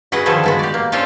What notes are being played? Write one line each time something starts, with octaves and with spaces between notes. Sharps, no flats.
F#4 G#4 B4 D#5 F#5
D3 D#3 F3 G#4 A4 B4
G#3 B3 F#4
G4 D5
A#3
C#4 D4 F4 A4 C5 C#5